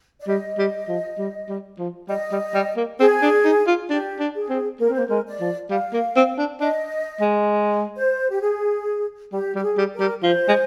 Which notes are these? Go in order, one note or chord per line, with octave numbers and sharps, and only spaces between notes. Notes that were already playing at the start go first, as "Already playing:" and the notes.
D5
G3 D#5
G3
F3
G3
G3
F3
G3 D#5
G3
G3
A#3
C4 G#4
D4
D#4
F4
D4 G4
D4
G#4
C4
A#3 A#4
C4 C5
A#3
G#3 A#4
D5
F3
G3 F5
A#3
C4
D4
D4 D#5
G#3
C5
G4
G#4
G3 G4
G3 G4
G#4
G3
A#4
G3
F3 C5
G#3